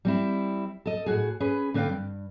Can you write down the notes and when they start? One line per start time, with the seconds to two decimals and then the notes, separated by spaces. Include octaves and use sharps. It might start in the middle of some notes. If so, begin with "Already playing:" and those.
0.05 G3 C4 E4
0.86 A4 D#5
1.06 A2 F#4 G#4
1.40 C#4 G#4 B4
1.74 D3 C4 B4 C5 F5 G5
1.89 G2